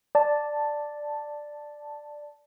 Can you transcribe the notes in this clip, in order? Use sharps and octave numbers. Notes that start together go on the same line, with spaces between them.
D5 A5